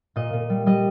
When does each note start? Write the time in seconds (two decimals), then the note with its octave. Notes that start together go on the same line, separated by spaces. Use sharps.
0.16 A#2 D#5
0.33 A#2
0.50 G3
0.66 G3 D#5